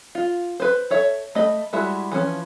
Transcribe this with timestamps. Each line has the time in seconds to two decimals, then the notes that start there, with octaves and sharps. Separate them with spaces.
0.15 F4
0.60 B4 C5
0.90 A4 C#5 E5
1.35 A3 D#5 B5
1.73 G3 G#3 E4 F#4 E5
2.12 E3 F3 C#4